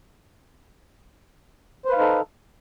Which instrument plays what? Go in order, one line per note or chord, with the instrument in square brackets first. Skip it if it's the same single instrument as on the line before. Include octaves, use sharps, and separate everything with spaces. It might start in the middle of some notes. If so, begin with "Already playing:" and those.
[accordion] C5
B4
F5
D#4
A4